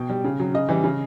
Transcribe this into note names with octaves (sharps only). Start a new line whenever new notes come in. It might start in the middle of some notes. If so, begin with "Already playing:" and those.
Already playing: B2 G5
G3
C#3
F#3
C#3 D#5
E3 G3
C#3